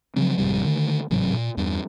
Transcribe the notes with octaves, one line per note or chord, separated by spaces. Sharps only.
C#3 F3 F#3 C4
G#1 F2 C3 G3
D3 D#3 A3
A1 G#2 C3 F#3
A#2
E2 G2